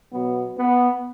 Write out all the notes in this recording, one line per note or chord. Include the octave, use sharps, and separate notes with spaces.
B2 F#3 B3
B3